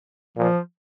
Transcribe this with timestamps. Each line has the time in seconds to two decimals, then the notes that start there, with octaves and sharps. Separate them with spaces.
0.37 A#2 F3